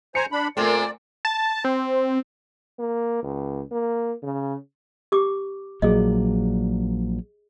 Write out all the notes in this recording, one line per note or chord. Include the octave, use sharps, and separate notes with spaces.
C5 G#5 A#5 C#7
D4 B5
A#2 A3 C4 A#4 D5
A5
C4
A#3
C#2
A#3
C#3
G4 D6
A#1 A#2 F#3 G#4 D#5